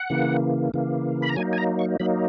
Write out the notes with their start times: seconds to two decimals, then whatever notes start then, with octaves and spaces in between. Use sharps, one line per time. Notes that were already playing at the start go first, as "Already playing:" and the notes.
Already playing: F#5
0.10 C#3 E3 A#3
0.74 C#3 E3 A#3
1.22 B5
1.29 A#5
1.36 F#3 A#3 D#4 G#5
1.53 G#5
1.58 A#5
1.79 C#6
2.00 F#3 A#3 D#4 B5